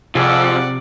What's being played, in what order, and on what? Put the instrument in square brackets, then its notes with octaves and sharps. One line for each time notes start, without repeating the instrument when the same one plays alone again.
[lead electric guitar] F2 [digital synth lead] C3 [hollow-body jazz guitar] F4 G#4 [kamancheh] D5 F#5